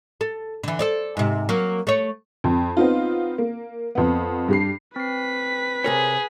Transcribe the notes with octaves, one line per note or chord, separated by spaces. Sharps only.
A4
D3 E3
A4 C5 D5
G#2 C3
F#3 A#3
A3 C#5
F2
B3 C4 D#4 F4
A#3
F2 B3
G2 G4 C7
C4 B4 B6 C7
C3 G#4 A#4 C#5